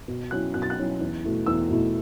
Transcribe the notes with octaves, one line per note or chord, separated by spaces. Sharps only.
B2
F#3 C#4 E4 F#6
B2 F#6
A6
F#6
F#3 C#4 E4
E2
B2 A3 E4
E2 E6
B2 A3 E4